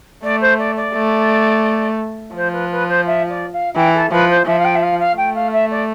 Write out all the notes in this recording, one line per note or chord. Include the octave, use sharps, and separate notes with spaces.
A3 D5
C5
D5
D5
A3
F3 C5
B4
B4
C5
E5
D5
F5
E3 G5
A4
F3 B4
C5
F3 E5
F5
G5
E5
F5
F5
A3 G5
F5
E5
D5